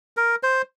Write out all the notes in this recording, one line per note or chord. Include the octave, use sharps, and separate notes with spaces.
A#4
C5